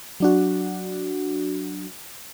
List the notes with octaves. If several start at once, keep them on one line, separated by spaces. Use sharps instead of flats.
F#3 D4 F#4